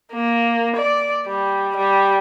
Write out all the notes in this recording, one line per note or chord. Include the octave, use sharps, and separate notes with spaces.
A#3
D5
G3
G3